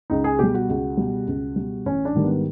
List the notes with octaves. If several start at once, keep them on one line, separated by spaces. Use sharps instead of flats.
C#2 D#4
G#4
B2 G3 G4
F#4
C#2
B2 G3
C#2
B2 G3
A1 C#4
D4
G#2 D#3 G3
B3